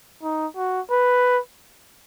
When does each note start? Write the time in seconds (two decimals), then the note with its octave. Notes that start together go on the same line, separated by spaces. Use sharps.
0.23 D#4
0.56 F#4
0.91 B4